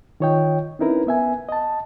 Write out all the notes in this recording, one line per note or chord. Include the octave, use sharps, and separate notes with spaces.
D#3 F4 C#5 D#5 G5
C4 C#4 D#4 E4 A#4 B4
B3 E5 G#5
D#5 A5